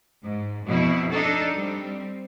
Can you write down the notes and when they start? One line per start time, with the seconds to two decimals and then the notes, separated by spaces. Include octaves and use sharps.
0.23 G#2
0.67 F2 B2 E3 E4
1.11 D4 D#4 A4
1.55 G3 C4